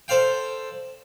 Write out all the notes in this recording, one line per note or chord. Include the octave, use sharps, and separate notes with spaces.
A4 C5 D5 F5 G5